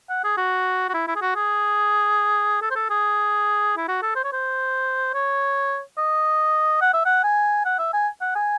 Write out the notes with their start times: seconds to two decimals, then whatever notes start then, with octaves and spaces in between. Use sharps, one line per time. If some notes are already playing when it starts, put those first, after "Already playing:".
0.09 F#5
0.24 G#4
0.37 F#4
0.89 F#4
0.94 E4
1.07 E4
1.15 G#4
1.21 F#4
1.35 G#4
2.62 A4
2.70 C5
2.76 A4
2.90 G#4
3.77 E4
3.88 F#4
4.02 A4
4.15 C5
4.24 C#5
4.33 C5
5.14 C#5
5.98 D#5
6.81 F#5
6.93 E5
7.05 F#5
7.23 G#5
7.65 F#5
7.79 E5
7.93 G#5
8.21 F#5
8.35 G#5